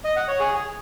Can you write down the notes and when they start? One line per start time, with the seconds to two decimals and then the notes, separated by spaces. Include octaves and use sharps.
0.04 D#5
0.16 F#5
0.28 C#5
0.40 G#4